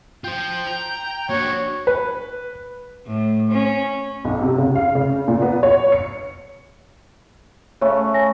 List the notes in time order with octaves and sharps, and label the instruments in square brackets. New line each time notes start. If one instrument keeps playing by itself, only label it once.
[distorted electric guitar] F4 C5 [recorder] G5
[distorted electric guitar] A#5
[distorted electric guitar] A#3 D4 [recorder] F#4 [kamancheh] C#5
[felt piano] B4
[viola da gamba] A2
C#4
[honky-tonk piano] B1
C3
C#3
F5
C#3
A#2
B3
C#5
C#7
[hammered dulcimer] C#3 A3 C#4 [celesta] C#5
[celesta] G#5 A#6